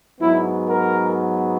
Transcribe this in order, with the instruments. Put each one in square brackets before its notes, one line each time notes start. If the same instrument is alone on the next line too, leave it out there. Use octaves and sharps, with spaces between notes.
[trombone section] G#2 F#3 B3 E4
A#4